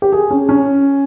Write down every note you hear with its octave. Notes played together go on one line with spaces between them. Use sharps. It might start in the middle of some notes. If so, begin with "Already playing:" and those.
G4
G#4
C#4
C#4